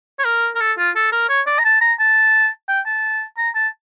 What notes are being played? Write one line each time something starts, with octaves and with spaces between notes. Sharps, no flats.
C#5
A#4
A#4
A4
F4
A4
A#4
C#5
D5
A#5
A5
A#5
A5
G5
A5
A#5
A5